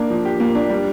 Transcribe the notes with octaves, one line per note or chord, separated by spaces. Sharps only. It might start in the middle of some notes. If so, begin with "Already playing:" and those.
Already playing: A#3 D4
F3
G4
A#3
D4
G3